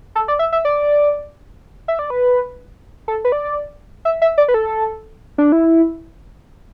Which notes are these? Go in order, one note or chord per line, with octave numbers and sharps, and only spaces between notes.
A4
D5
E5
E5
D5
E5
D5
B4
A4
B4
D5
E5
E5
D5
B4
A4
D4
E4